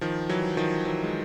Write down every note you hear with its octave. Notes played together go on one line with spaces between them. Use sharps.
D#3 F3
E3 F#3
D#3 F3
E3 F#3
G#3